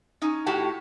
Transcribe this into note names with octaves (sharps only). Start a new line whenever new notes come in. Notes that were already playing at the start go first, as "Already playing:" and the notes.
C#4 D#4
A2 F#4 G4 A5